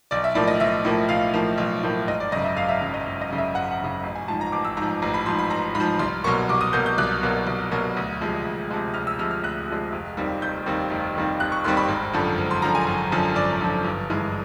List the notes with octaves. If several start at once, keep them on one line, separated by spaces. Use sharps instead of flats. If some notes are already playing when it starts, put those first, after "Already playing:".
B1 D5
E5
A2 F3 A#3 D5
D#5
B1 E5
A2 F3 A#3
B1 F5
A2 F3 A#3
B1
A2 F3 A#3
G#1 D#5
D5
F#2 C#3 D#5
E5
G#1 F5
E5
F#2 C#3
D#5
G#1
D#5
F#2 C#3
E5
G#1 F#5
F#5
F#2 C#3
A1
G#5
G#2 F3 A5
A#5
A1 D6
E6
G#2 F3 A#5
A1 A#5
B5
G#2 F3 C6
B5
A1 A#5
G#2 B5
F3
C2 C6
B2 F#3 A#3 C#6
C2 D6
D#6
B2 F#3 A#3 G6
G6
C2 F#6
B2 F#3 A#3
C2
B2 F#3 A#3
D2
C3 F3 G#3
D2
C3 F3 G#3
D2 F6
E6
C3 F3 G#3 F6
F6
D2 F#6
C3 F3 G#3
F1
D#2 D#3 G3 C4
F1 G6
D#2 D#3 G3 C4
F1
D#2 D#3 G3 C4
F1 F#6
C#6
D#2 D#3 G3 C4 C6
B5
G#1
F#2 D3 F3
G#1
C6
F#2 D3 F3 A#5
G#5
G#1
F#2 D3 F3
G#1 D5
F#2 D3 F3
G1
G2 E3 G#3